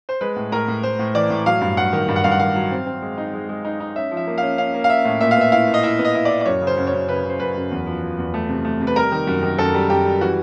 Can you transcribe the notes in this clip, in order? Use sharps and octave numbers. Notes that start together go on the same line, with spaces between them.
C5
G#3 B4
A2
A2 A#4
A2
A2 C5
A2
E3 D5
A2
F#3 F5
G2
G2 F#5
D#3
G2
F#5
G2 F5
F#5
D#3 F5
F#3
C4
C4
G#3
D#4
G#3
G#3
D#4
D#4
C#4 E5
F3
E5
A#3
F5
C#4
C#4 F5
A#3
F5
C#4 E5
A2
A#2 E5
F5
B3 E5
E4 F5
A#2
D#5
E4 E5
B3
D#5
E4
D5
E4
D5
F#2 C#5
C#3
C5
F#2
C#5
F#2
C#3 B4
C#3
C5
F#2 B4
F#2
E2
F3
F3
E2
A3
C3
A3
C3
B4
G3 A#4
D#3
F#2
D#3
F#2 A4
G3
F#2 G4
G3
E3 F#4